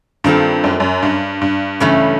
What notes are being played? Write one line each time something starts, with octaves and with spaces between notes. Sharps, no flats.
G2 D#3 G3 C4 F4 A4
F#2
F#2
G2
G2
G2 C#3 E3 A3 C#4